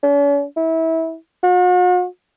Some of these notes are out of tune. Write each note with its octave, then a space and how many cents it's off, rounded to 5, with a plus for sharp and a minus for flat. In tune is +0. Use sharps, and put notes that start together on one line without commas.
C#4 +45
E4 -25
F#4 -45